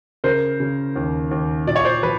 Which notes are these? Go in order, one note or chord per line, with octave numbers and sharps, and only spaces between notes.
C#3 A#4 C5
C#3
D#2
D#2
A#2 D5
C#5
C5 D5
F3 B4